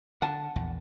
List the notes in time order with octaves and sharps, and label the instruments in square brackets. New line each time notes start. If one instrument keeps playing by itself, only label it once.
[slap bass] D3 [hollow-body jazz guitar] F#5 A5
[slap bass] A#1 E2